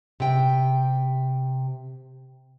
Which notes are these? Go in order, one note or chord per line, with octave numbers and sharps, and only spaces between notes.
C3 G5